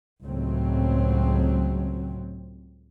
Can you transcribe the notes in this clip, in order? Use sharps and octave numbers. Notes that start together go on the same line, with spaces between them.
C#2 A2 F#3 C4